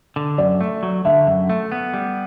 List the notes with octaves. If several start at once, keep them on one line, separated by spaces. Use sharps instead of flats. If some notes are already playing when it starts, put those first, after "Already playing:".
D3
F#2 D5
A3
F#3
D3 E5
F#2
A3
B3
G3